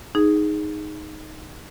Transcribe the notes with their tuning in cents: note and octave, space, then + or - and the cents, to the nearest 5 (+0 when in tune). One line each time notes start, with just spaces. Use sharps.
D#4 +0 G#4 +0